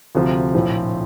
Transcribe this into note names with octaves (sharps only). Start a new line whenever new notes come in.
D2 C3 F3
A#1 A2 F3 C4